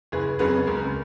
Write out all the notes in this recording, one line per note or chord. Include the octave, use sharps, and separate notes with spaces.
F#1 G#4 B4
F2 C#3 F#3 B3 G#4 B4
C#2 A#4